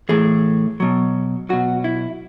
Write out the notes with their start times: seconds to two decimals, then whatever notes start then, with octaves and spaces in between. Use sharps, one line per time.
0.09 A2 E3 G#4
0.80 B2 F#3
1.49 B2 F#3 F#4
1.84 E4